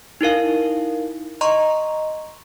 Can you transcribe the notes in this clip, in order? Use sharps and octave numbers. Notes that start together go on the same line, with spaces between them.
D#4 E4 A#4 F5
D#5 A#5 C6 C#6